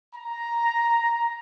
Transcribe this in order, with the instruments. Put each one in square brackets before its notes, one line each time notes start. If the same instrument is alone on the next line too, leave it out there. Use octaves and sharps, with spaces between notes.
[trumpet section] A#5